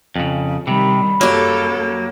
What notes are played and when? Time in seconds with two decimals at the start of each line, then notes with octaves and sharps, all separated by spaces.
0.16 F2 C#3
0.67 C3 D#3 G3 B5
1.21 F#2 F#3 A#3 G4 A4